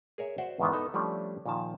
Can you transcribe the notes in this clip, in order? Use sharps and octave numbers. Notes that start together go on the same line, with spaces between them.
G#4 A#4 C#5 E5
F#4 C5 D5 E5 F#5
E2 G#2 D#3 E3 B3
B3 D#4 A4
F3 G3 A3 C#4 D4
A#2 D#3 F3 A5